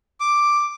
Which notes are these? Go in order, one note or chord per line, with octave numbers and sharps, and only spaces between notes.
D6